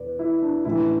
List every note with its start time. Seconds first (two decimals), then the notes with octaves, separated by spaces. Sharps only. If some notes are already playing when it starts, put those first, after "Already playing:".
Already playing: E1 E3 B4 D5
0.19 E4
0.42 D4
0.65 A1 A2 E3 E4